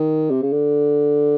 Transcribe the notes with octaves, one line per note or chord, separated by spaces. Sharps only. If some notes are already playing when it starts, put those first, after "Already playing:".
Already playing: D#3
C3
C#3
D3